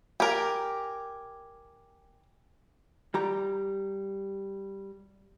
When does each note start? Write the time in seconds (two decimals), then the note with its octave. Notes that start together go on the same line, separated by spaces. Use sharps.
0.20 G4 A#4 G#5 D6 D7
3.14 G3 G4 A#5